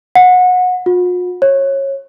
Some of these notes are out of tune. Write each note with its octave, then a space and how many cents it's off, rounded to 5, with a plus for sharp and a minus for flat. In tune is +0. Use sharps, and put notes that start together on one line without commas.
F#5 -25
F4 +45
C#5 -20